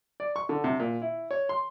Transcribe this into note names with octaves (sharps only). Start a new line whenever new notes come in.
D5
C#6
D3
C3
A#2
E4
C#5
C6